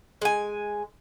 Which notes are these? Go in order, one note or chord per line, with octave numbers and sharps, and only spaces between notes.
G#3 G#5